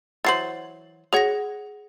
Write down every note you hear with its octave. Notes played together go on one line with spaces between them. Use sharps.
E3 F#3 C5 A6 C7 F#7
F#4 G#4 C#5 F#5 A#6